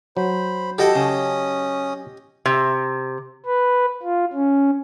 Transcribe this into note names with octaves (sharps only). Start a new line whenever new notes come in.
F#3 C5 B5
E4 F#4 G4 A4 D#5 G5
C#3 C#4 A5 D#6
C3
B4
F4
C#4